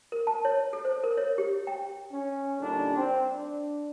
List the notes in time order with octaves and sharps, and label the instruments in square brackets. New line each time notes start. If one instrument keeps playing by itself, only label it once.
[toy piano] A#4
A5
C#5
A4
C5
A#4
C#5
G4
G5
[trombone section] C#4
A#2 D3 G3 D4 D#4
C4
D4